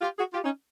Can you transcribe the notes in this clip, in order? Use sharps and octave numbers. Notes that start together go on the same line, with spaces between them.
F4 G4
F#4 G#4
F4 G4
C#4 D#4